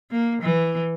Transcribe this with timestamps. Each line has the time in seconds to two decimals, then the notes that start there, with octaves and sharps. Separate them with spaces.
0.11 A#3
0.42 E3